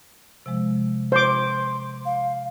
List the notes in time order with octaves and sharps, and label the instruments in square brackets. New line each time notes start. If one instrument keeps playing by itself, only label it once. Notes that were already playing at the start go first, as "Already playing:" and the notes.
[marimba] C3 F3 G#3
[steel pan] C5 D6 [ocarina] C6
[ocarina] F5